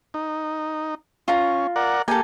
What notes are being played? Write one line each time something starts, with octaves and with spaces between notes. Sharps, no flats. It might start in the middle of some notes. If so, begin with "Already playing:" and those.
D#4
C#4 F4 A#5
A#4 D5 F#5
A#3 G4 A4 G#5